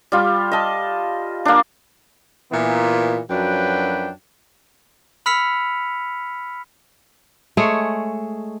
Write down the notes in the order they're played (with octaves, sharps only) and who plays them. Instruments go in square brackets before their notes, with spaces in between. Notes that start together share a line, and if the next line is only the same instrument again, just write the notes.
[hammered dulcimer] G3 F4
D#5 A5
A#3 D4
[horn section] A#2 E3 B3
F#2 F3 F#3 D4 B4 G5
[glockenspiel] B5 E6 F6 B6 C#7 F7
[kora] G#3 A3 G#4 C#5